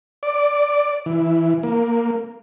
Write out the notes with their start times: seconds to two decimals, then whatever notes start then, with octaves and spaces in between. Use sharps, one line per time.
0.23 D5
1.06 E3
1.63 A#3